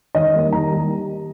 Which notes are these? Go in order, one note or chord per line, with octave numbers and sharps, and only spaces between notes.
D#3 D#5
G3 A#3
D#3 A#5
G3 A#3